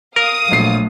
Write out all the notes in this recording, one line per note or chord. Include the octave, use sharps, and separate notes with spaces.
A#4 F5 D#6
A#1 F#3 A3 C7